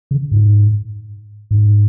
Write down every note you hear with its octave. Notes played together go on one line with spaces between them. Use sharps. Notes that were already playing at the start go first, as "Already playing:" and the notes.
C#3
G#2
G#2